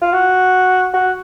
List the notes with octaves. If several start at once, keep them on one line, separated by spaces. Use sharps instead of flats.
F4
F#4
F#4